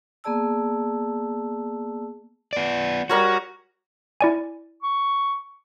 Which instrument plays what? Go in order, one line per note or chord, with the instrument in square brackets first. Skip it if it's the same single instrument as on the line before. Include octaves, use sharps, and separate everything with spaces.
[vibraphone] A#3 B3 G#4 D5 A5 E6
[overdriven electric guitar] B3 D5
[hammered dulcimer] G3 A#4 C#5 [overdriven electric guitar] F#4
[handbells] E4 D5 G#5
[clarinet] C#6